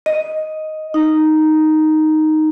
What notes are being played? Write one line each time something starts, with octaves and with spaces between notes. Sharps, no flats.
D#5
D#4